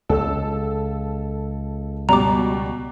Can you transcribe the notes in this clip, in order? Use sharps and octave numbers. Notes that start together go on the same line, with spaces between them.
C#2 A4 E6
B2 G3 A#5 D6